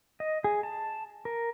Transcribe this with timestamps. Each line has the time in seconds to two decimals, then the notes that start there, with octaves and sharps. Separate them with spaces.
0.20 D#5
0.44 G#4
0.63 A5
1.25 A#4